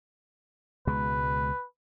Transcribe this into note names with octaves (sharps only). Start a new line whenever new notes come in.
C#2 B2 G#3 B4